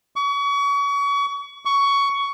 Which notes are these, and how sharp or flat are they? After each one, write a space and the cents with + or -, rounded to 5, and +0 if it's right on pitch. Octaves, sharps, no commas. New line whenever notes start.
C#6 +35
C#6 +15